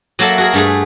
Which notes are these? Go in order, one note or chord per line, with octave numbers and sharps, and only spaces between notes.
F#3 A#3 F#4 A4 E5
F#4 G#4 A#4
G2 A3 G#4